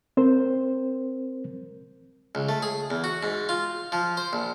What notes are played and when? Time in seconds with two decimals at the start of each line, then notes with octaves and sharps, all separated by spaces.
0.17 C4 A#4 C5
2.35 C#2
2.49 A3
2.62 G#4
2.90 E2
3.04 F#4
3.23 G#2
3.49 F4
3.92 F3
4.17 C5
4.33 A#1